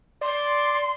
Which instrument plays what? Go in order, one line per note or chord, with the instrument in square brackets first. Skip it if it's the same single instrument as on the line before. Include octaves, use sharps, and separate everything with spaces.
[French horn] D5 [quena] C6